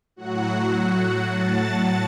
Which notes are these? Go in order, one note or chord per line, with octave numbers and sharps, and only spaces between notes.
A2 F#3 F#4 F#5
A5 A6